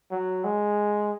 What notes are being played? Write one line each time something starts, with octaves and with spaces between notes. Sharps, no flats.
F#3
G#3